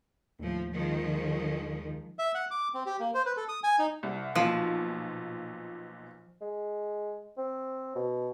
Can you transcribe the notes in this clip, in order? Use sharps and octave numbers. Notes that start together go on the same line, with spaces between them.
D#2 A2 F3
D#3 F3 G#3
E5
F#5
D6
C4
G4
A#3
C5
B4
A4
D#6
G#5
D#4
C2 E4
B1 A#2 F3
G#3
C4
B2